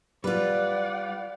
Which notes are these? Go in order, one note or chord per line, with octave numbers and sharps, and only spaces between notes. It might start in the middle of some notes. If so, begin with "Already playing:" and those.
G3 F4 B4 D5 F#5